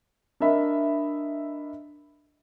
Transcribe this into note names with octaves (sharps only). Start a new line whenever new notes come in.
D4 A#4 D#5 E5 B5